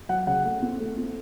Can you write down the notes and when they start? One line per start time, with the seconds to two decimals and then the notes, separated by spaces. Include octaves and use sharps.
0.09 F#3 F#5
0.27 C#3 F#5
0.45 A3
0.62 C4
0.80 A3
0.98 C4